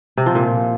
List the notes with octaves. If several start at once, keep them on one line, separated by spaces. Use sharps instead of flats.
C3
F3
A#2